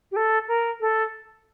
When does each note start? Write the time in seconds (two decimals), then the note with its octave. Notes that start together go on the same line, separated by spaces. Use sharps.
0.12 G4
0.16 A4
0.48 A#4
0.81 A4